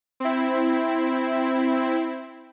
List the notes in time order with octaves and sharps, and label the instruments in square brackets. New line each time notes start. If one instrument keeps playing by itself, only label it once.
[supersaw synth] C4 E4